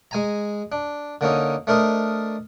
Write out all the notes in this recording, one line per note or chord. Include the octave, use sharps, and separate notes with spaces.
G#3 G#5 A#5
D4
D3 A#3 C#4 D#4
A3 D4 A#4 C5 D#5